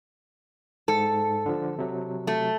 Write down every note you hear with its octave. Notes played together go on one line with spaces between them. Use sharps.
G#2 A4
D3 F3
C3 F#3
A3